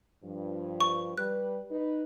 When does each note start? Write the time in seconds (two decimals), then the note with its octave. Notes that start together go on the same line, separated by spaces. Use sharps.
0.24 G2 F3
0.80 C#6
1.18 G3 B4 F#6
1.71 D#4 B4